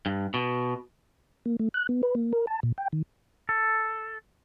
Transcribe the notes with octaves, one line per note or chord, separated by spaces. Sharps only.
G2
B2
A#3
A3
F#6
B3
B4
A#3
A#4
A5
A#2
G5
D#3
A4